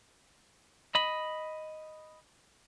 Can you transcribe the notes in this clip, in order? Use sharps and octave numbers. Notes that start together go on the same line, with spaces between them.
D#5 B5